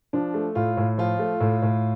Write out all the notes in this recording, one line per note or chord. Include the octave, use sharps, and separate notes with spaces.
F3 D4
A3
A2 F4
A2
F3 F4
A3
A2
A2